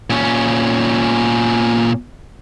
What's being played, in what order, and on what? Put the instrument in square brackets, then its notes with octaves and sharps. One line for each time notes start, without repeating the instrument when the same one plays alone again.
[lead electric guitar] A#2 C#4